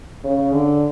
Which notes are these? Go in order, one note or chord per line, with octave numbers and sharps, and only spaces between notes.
C#3
D3